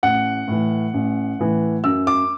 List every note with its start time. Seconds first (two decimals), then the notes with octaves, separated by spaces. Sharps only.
0.03 A1 F#5
0.48 A2 E3
0.94 A1
1.39 A2 E3
1.84 F#2 E6
2.07 D6